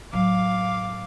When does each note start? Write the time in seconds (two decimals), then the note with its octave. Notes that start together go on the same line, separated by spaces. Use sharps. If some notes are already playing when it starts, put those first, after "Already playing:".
0.13 A2 F#3 F5 D6